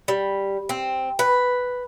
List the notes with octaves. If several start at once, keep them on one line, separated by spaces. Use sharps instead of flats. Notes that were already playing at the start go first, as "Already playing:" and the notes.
G3
C4
B4